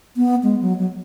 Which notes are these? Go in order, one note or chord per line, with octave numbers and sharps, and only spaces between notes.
B3
G#3
F#3
F#3